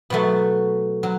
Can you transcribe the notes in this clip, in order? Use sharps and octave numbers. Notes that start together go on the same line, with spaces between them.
B2 F#3 A3
F#3